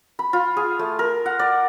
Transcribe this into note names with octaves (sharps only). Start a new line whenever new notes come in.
B5
F4
G#4
A3
A#4
F#5
D5